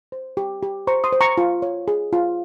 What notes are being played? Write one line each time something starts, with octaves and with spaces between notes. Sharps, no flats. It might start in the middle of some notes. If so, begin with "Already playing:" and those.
C5
G4
G4
C5 A#5 C#6
C6 D#6
C5
A#5 C#6
F4
C#5
G#4
F4